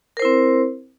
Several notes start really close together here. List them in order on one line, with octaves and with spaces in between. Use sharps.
A#4 C5 E4 C4